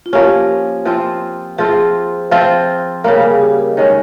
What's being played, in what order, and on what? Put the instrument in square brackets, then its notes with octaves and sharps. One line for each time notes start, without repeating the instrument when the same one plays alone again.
[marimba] F4
[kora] F3 A#3 C#4 [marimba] G4
[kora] F3 C4 F4
[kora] F3 C4 F4 [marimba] G#4
[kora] F3 C4 F4
[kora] C#3 G3 A#3 [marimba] A#4
[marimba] G#4
G4
A#4
D#5
[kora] D#3 G#3 C#4 [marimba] C#5